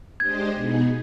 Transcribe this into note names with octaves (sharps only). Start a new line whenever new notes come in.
G#3 D4 G4 C5 D#5 G#6
B2 B3 D#4 G#4